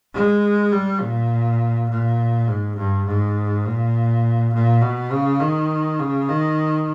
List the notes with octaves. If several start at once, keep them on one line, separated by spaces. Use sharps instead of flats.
G#3
G3
A#2
A#2
G#2
G2
G#2
A#2
A#2
B2
C#3
D#3
C#3
D#3